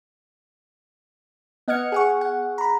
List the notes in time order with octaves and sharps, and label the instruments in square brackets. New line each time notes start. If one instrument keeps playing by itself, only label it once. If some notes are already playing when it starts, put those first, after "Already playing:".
[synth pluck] B3 D#5 F#5 F6 G#6 C#7
G#4 F#5 C#6
F#5
A#5 B5